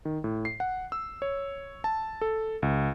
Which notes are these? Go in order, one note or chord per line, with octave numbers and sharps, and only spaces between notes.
D#3
A2
C7
F#5
E6
C#5
A5
A4
C#2